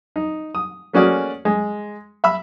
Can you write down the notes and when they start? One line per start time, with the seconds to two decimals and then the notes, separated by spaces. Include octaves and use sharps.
0.16 D#4
0.55 D#6
0.93 A3 A#3 C#4 F#4 G#4 D5
1.45 G#3
2.24 E5 B5 E6